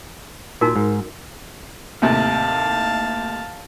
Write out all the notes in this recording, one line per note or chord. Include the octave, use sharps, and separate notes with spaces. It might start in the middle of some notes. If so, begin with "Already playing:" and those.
A#2 D#4 F#4 A#4
G#2
D#2 A2 C3 F5 A5